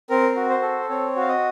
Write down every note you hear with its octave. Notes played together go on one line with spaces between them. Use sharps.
C4 A#4
F#4
C5
A4
C4 C#5
F#4
F5
D#5